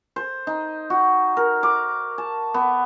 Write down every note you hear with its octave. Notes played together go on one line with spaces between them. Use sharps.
C5
D#4
F#4
A#4
D6
A5
B3